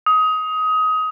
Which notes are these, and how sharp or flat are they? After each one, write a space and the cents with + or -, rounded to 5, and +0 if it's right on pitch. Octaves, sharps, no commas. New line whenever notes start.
D#6 +20